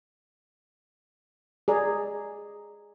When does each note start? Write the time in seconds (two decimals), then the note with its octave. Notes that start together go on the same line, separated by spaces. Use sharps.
1.68 G#4 D5 A#5